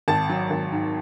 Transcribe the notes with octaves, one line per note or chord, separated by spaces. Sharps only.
G#1 A5
F#3
G#1
G#2